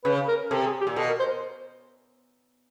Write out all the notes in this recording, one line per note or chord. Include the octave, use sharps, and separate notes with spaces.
C#3 B4
A#4
C3 A4
G#4
G4
A#2
B2 A4
A#4
C5